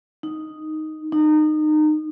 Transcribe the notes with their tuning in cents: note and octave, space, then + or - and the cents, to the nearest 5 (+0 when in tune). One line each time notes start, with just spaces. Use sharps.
D#4 +0
D#4 -25